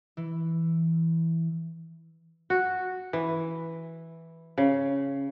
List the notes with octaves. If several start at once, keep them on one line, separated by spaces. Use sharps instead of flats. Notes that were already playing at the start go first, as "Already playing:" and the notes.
E3
F#4
E3
C#3